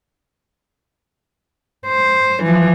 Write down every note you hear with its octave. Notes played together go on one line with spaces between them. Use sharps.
C5
E3 F3